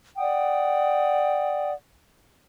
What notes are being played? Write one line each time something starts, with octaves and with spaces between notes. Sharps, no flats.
D5 F#5 G5 D#6